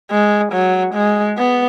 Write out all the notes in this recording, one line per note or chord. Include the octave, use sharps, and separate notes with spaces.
G#3
F#3
G#3
B3